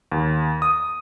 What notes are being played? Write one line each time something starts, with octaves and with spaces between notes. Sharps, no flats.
D#2
D#6